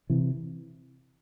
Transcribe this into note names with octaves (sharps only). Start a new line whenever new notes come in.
C3 E3